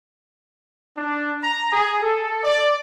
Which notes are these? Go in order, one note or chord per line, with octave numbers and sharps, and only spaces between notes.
D4
A#5
G#4
A4
D5